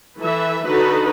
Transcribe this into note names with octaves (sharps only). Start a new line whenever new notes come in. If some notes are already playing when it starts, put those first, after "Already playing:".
E3 A4 B4 E5
D3 D#4 F#4 A4 B4